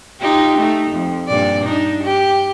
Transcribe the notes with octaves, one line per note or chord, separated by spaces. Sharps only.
D#4 F4 G4
A3 D#4
F2
G2 A#2 D5
D4 D#4
G4